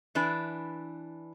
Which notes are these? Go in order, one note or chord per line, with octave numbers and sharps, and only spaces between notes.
E3 D4 B4